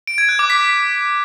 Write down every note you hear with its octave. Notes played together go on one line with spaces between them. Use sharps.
D7
G#6
F#6
D6
B6